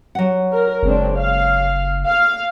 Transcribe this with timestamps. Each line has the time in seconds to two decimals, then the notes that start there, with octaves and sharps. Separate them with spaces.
0.15 F#3 F#5
0.53 A#4
0.83 F#1 G#3 C4 D4
1.16 F5
2.04 F5